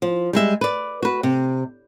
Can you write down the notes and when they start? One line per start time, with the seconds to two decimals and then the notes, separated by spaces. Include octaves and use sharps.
0.02 F3
0.33 G3 G#3 E5
0.61 B4 D5
1.02 F#4 B4
1.23 C3